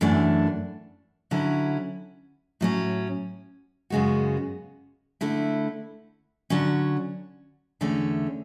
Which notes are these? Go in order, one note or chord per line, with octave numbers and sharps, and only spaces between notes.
F#2 E3 A3 D4
D3 F#3 C#4 E4
A2 F#3 C#4
F#2 C#3 G#3 B3 F#4
D3 A3 E4
D3 F#3 C#4
E2 D3 A3 C#4